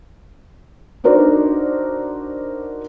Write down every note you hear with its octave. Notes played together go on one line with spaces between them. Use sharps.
D4 D#4 F#4 A#4 C5 D5